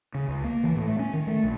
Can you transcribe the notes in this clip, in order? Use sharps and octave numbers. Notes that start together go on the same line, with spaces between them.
C#3
C#2
A#3
E3
A2
A3
C#4
D#3
A3
A#1